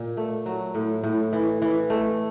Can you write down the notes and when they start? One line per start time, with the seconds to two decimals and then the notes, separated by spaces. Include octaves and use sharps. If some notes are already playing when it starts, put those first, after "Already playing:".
Already playing: A#2
0.17 A3
0.46 F#3
0.75 A2
1.04 A2
1.33 E3
1.62 E3
1.90 A3